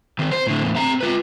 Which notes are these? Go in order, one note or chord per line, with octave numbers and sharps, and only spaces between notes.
D#3 C4
C5
A2 D3
E2 A2
C4 A#5
F4 B4